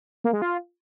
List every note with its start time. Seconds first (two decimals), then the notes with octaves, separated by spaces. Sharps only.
0.24 A#3
0.33 G#3
0.42 F4